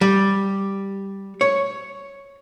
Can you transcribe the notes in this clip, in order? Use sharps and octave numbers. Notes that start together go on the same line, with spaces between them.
G3
C#5